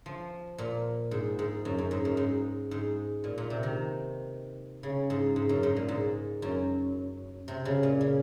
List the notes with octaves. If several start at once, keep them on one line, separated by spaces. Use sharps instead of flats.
F3
A#2
G#2
G#2
F#2
F#2
G#2
F#2
G#2
G#2
A#2
A#2
C3
D#3
C#3
G#2
G#2
F#2
G#2
A#2
G#2
F#2
C3
C#3
A#2
C#3